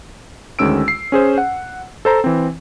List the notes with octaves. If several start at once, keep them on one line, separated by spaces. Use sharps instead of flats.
D2 D#3 G#3 C#4 E6 D7
C7
C#4 G#4 C5
F#5
A4 C5 A#5
E3 C4